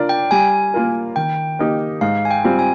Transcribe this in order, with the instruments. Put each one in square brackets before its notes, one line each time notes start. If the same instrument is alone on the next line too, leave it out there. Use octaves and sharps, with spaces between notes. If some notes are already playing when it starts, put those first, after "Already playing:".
Already playing: [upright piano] D4 F4 A#4 D5
[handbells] G5
[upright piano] G3 [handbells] G#5
[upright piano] A#3 F4 A#4
[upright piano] D#3 [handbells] G5
[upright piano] A#3 D#4 G4
[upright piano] G#2 [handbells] F5
[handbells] G#5
G5
[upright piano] G3 C4 F4
[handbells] G#5